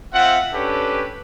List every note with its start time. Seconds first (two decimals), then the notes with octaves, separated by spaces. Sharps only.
0.13 C4 F4 E5 F#5
0.53 C#4 D4 G4 A4 B4